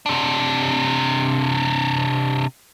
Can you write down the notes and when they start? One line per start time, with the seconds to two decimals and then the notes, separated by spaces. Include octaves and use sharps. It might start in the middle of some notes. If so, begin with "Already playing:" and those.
0.06 C3 D4